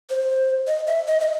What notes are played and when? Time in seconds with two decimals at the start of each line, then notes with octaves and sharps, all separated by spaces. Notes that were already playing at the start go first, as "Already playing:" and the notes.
0.10 C5
0.67 D#5
0.87 E5
1.07 D#5
1.21 D#5